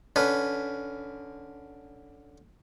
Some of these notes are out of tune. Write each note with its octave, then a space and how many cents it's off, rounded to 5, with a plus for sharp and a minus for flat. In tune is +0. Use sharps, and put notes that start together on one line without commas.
D3 +0 C#4 +15 B4 +0